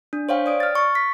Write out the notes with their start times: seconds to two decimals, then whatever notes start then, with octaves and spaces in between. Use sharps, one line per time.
0.13 D4
0.29 C5 C#5 F5 G5
0.46 D5 D#6 D7
0.60 F6 A6
0.75 C#6 A6
0.95 B6